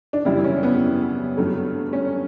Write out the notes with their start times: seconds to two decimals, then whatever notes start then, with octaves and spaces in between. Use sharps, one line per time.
0.13 D4
0.25 F#2 C#3 E3 G3 E4
0.44 C#4
0.63 B3
1.37 G2 F#3 A3
1.93 C#4